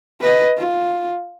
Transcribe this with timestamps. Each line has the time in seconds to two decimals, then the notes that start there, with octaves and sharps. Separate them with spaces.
0.21 B4 D#5
0.57 F4